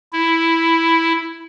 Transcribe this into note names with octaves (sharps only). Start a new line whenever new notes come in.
E4